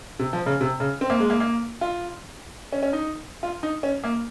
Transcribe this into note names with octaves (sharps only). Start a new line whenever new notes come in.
C3
F3
C#3
C3
C#3
C4
A#3
G#3
A#3
A#3
F4
C#4
C#4
D#4
F4
D#4
C#4
A#3